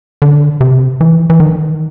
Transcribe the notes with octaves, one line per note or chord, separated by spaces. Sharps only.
D3
C3
E3
E3
D#3